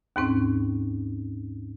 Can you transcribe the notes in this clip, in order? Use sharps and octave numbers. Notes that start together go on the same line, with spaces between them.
D#2 G#2 C4 C#4